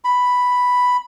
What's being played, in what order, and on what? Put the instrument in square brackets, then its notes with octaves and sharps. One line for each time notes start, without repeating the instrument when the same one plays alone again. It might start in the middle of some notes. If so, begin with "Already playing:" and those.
[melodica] B5